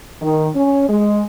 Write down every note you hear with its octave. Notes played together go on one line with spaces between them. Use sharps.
D#3
C#4
G#3